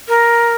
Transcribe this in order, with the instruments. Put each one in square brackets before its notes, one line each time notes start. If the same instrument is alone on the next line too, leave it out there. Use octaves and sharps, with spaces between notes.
[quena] A#4